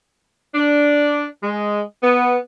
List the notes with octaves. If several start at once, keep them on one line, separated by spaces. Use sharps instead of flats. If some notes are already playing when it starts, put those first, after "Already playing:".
D4
G#3
B3